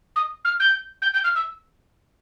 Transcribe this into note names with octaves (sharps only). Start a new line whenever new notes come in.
D#6
F6
G6
G6
G6
F6
E6